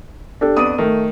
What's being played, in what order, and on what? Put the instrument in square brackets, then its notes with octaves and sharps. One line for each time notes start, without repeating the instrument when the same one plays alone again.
[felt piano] D4 G4 A4
[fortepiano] F2 B3 D4 [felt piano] D#6 D#7
[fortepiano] D#3 [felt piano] A3